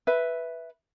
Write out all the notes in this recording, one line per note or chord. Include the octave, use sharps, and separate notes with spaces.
B4 E5